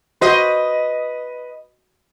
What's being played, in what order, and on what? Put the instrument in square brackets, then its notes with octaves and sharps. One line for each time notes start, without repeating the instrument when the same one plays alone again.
[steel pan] F#4 C5 C6 [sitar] B4 D#5